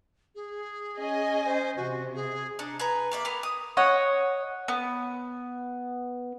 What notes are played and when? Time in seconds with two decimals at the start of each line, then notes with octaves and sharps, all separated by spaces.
0.35 G#4
0.98 C#4 D#5 G#5
1.45 C5
1.77 C3 F#4
2.15 G#4
2.59 D4 D#4
2.79 G#4 B4 A#5
3.12 A#3 D5 E5
3.25 B3 A#4 G#5 B5
3.43 D#6
3.77 C#5 D#5 F#5
4.68 B3